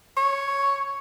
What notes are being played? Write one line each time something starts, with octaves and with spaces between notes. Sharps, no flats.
C#5